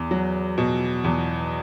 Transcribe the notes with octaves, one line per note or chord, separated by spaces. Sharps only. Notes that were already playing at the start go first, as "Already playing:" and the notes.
Already playing: E2
F#3
B2
E2